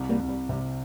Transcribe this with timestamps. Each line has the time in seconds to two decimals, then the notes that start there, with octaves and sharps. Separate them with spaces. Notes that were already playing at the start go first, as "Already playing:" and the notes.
Already playing: C2
0.09 G3 A#3
0.19 C2
0.28 G3
0.49 C3 G3